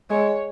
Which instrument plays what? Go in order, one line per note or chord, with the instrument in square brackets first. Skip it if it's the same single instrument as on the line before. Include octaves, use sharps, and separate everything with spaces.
[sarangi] G#3 [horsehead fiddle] C#5